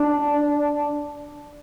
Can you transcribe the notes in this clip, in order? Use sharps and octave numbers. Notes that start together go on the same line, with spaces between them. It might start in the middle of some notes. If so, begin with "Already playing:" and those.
Already playing: D4